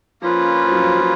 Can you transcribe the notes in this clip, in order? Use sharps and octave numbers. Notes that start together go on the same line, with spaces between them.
F3 A#3 C#4 F4 B4
F3
F#3
F3
F3